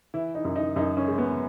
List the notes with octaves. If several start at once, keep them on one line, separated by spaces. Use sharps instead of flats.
E3 E4
D#4
F#2
D#4
F#2 D#4
C#4
G#3
B3